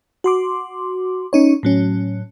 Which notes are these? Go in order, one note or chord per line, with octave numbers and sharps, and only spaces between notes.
F#4 C6 D6
C#4 D#4 C#5
A2 F#3 C#4